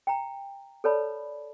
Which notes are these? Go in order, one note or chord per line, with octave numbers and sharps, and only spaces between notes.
G5 A#5
A4 B4 C#5 D5 A5 B5